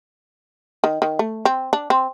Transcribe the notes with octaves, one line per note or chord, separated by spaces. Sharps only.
D#3
D#3
A3
C4
D4
C4